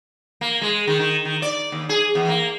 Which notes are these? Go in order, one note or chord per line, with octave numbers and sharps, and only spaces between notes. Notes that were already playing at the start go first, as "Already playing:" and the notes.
A#3
G#3
D#3
D#3
D#3
D5
D#2
G#4
E2
A#3